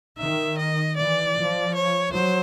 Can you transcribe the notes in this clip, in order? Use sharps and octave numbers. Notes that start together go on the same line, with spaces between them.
D#3 E5
D#5
E3 D5
F3
C#5
F#3 C5